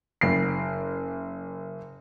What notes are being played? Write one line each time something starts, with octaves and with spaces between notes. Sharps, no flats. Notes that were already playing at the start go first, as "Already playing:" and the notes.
F#1 C7